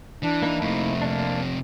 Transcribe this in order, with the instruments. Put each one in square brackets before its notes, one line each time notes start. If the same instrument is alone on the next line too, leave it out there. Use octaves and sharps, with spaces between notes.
[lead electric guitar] E3 [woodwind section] D4
[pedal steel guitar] A#3 D#4 E4
[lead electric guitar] F2 C3 [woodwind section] A3
[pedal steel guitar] A#3 D4